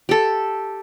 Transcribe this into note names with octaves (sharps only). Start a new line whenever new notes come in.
G4 A4